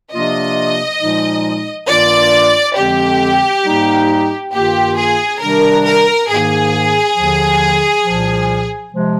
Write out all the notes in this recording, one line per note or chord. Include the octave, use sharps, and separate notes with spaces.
C3 F3 A#3 D4 F4 D#5
A#2 F3 G#3 D#4
G2 D#3 A#3 D4 F4 D5
F2 D3 F3 G#3 C4 G4
G#2 G3 A#3 D#4
G2 D#3 A#3 F4 G4
G#4
C3 D#3 G3 D4 A#4
A#4
G#2 D#3 A#3 G#4
D#2 D3 F3
C2 A#2 F3
C3 F3 G#3